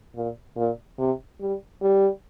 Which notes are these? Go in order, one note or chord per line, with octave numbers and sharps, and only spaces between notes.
A#2
A#2
C3
G3
G3